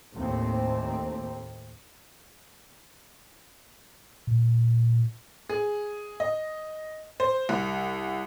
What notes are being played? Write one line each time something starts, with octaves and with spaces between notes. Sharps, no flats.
D#2 A2 A3 C4
A#2
G#4
D#5
C5
C2